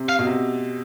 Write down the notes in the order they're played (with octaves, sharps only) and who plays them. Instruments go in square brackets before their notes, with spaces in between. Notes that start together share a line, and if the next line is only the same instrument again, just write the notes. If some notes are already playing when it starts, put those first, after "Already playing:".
Already playing: [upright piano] C3
[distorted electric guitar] F5
[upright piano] B2
C3